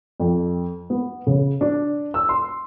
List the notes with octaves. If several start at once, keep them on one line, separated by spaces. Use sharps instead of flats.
F2
B3
C#3
D4
E6
C6